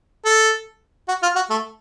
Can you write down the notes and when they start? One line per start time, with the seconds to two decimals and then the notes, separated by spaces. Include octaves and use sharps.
0.25 A4
1.08 F#4
1.22 F4
1.36 F#4
1.50 A3